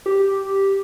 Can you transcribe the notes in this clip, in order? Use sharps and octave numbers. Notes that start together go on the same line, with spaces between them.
G4